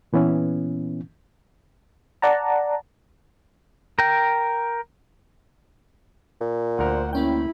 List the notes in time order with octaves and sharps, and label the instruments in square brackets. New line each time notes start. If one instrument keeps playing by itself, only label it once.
[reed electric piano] A#2 E3 B3 C#4 E4
[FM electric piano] D5 F#5 A5 A#5
[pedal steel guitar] A#4 G5
[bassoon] A#2
[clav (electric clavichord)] D2 A#4 [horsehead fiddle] C5 F#5
[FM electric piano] A#3 C#4 G5 [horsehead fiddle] E4 B5